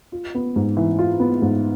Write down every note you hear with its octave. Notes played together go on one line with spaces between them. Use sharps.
F4
B3
G#2
E3
F4
B3
G#2